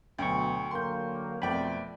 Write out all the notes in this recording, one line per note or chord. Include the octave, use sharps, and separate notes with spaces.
D2 B2 F#3 G5 C#6
D3 F#3 A#3 C6 G6
F2 B2 A3 C4 D5 G5 B5